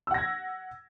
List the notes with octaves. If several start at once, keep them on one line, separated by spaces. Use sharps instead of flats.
F#5 E6 G#6 A#6